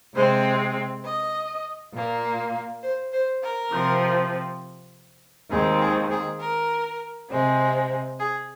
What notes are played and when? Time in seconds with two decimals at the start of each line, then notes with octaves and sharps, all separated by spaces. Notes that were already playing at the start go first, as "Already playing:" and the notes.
0.14 C3 G#3 C4 C5
1.04 D#5
1.93 A#2 A#3
2.82 C5
3.12 C5
3.42 A#4
3.71 C3 F3 C4
5.51 D#2 D#3 G#3 C4 G#4
5.80 G#4
6.10 G#4
6.40 A#4
7.29 C3 G#3 C4
8.19 G#4